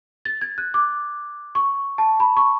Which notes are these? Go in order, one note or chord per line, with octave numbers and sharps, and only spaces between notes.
A6
G#6
F#6
D6
C#6
A5
B5
C#6